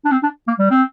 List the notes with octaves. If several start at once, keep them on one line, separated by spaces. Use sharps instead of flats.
D4
C4
D4
A#3
G3
C4